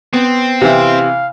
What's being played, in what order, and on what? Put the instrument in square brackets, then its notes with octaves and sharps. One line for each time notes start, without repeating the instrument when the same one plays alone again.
[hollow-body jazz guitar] B3 [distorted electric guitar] C4
[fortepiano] C3 E3 E4 [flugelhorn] F5